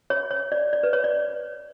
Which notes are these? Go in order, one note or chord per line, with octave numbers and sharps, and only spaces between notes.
C#5
C#5
D5
D5
B4
C#5
D5